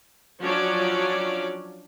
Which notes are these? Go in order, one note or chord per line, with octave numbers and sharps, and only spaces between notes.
F3 F#3 C#4 D4 C#5 D5